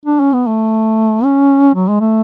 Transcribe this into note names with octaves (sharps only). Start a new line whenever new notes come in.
D4
C#4
B3
A3
C#4
F#3
G#3
A3